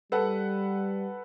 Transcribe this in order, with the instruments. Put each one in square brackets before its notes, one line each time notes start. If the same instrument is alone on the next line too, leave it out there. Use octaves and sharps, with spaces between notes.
[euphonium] G3 [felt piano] A4 B4 F#5